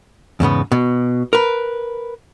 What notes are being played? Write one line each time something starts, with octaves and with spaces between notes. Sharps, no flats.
E2 G#2 C#3 B3
B2
A#4 B4